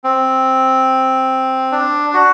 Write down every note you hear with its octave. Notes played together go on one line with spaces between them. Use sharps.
C4
D4
F#4